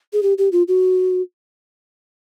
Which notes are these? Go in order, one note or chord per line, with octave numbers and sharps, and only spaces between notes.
G#4
G4
G4
F4
F#4